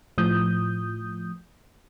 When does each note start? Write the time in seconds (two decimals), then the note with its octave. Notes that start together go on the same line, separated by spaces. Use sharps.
0.18 A2 F3 D#6 G6